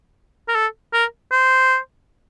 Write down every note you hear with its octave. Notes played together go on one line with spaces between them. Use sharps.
A#4
A4
A#4
C5